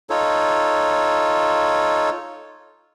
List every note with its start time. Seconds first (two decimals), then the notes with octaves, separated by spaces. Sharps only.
0.10 D#4 F4 A4 C#5